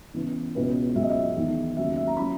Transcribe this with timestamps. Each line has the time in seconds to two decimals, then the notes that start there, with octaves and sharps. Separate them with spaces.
0.14 C#3 E3 B3 E4
0.55 C#2 B2 G#3 C#4 E4 B4
0.95 C#2 C#3 F#3 B3 E5
1.03 D#5
1.10 E5
1.36 E2 D#3 G#3
1.77 D#2 C#3 F#3 B3 E5
1.97 E5
2.07 A#5
2.17 F#3 C#4 E4 B5